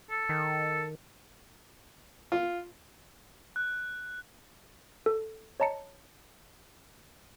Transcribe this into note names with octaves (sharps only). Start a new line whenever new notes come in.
A4
D#3
F4
F#6
A4
C#5 D#5 A5 A#5 C#7